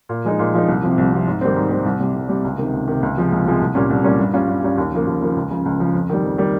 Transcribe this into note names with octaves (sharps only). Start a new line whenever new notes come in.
A#2
F3 G#3 D#4
A#2
F3 G#3 D#4
C2
C3 F3
C2
C3 F3
G#2
D#3 G3 C4
G#2
D#3 G3 C4
C2
C3 G3
C2
C3 G3
C#2
C3 D#3
C#2
C3 D#3
C#2
C3 F3 G#3
C#2
C3 F3 G#3
C2
A#2 G3 C#4
C2
A#2 G3 C#4
G2
G3 C#4 F4
G2
G3 C#4 F4
D#2
C#3 F3 A#3
D#2
C#3 F3 A#3
C#2
C#3 F3
C#2
C#3 F3
F2
D#3 G3
F2
D#3 G3